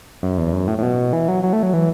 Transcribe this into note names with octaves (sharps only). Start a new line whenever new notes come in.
F#2
E2
F#2
A2
A2
B2
E3
F#3
F#3
A3
F#3
E3